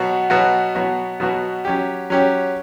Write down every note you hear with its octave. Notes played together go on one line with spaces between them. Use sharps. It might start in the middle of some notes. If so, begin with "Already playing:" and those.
Already playing: B2 F#3 B3 F#4
B2 F#3 B3 F#4
B2 F#3 B3 F#4
B2 F#3 B3 F#4
F#3 C#4 G4
F#3 C#4 G4